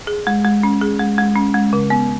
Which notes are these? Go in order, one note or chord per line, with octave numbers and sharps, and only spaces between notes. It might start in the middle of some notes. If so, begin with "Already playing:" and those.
G#4
G#3
G#3
C#4
G#4
G#3
G#3
C#4
G#3
C#3
B3